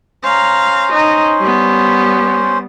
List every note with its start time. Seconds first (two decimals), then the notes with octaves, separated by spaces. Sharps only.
0.23 C#4 C5 F5 A#5
0.92 D#4
1.40 G3 B3